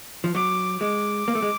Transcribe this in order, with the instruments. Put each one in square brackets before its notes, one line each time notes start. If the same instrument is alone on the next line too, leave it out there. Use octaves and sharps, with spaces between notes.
[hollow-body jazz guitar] F3
[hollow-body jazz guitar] F#3 [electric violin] D6
[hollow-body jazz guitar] G#3 [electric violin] D6
[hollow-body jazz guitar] A#3
A3
G#3